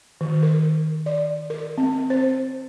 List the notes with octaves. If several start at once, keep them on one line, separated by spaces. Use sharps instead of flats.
D#3
A#4
D5
A#4
C4
C5